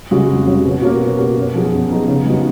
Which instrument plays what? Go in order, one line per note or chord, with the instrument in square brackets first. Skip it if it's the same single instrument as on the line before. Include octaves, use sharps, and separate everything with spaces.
[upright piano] C#3 G#3 C#4 F#4
F2
C#3 G#3 C#4 F#4
B2
A#3 C#4 F#4
B2
A#3 C#4 F#4
F#2
F3 B3 D#4 G#4
F#2
F3 B3 D#4 G#4
C#3
G#3 B3 D#4 F#4